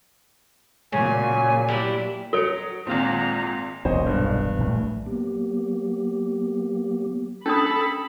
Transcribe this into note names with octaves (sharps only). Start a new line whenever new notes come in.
A#2 C#3 F#3 G#5
G3 D4 E4
F#3 A4 C#5 C#7 D7 G7
G#1 A#2 G#3 C4 F4 A#5
E1 B1 A#2 C5 C#5 D#5
G2
A#1 A2 A3
F#3 A#3 B3 G4
C#4 D4 A4 B5 D#6